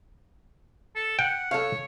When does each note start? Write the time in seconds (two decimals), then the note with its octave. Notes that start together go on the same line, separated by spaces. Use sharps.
0.96 A4
1.19 F#5 G5
1.51 A4 C#5 F5